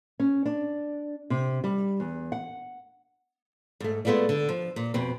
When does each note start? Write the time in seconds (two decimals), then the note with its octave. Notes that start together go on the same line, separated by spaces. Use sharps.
0.20 C#4
0.46 D4
1.30 C3
1.64 G3
2.00 E2
2.32 F#5
3.80 G#2 A3
4.05 G#3 A3 B3 F4 D5
4.29 D3
4.49 F3
4.76 A#2
4.94 F2 B2 C4